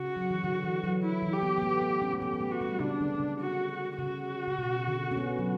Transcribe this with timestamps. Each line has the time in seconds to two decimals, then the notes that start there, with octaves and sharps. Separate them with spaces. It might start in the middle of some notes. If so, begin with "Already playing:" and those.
Already playing: C#3 F#4
0.16 F#3
0.30 E3
0.44 D3
0.64 E3
0.84 F#3
1.03 E4
1.22 E3
1.33 G4
1.42 B3
1.58 B3
1.62 A3
1.82 B3
2.02 C#4
2.13 A3
2.22 B3 G4
2.34 B3
2.41 A3
2.52 F#4
2.61 G3
2.80 C#3 D4
3.00 D3
3.15 D3
3.20 C#3
3.40 F#4
3.99 C#3 F#4
4.48 C#3
4.58 B2
4.87 D3
5.11 C#4
5.17 B3
5.38 F#3